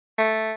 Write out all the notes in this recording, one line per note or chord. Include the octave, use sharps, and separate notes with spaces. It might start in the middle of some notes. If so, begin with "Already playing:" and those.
A3